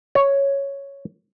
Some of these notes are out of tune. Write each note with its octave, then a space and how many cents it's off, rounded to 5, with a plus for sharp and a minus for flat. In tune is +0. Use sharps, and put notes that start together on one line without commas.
C#5 +0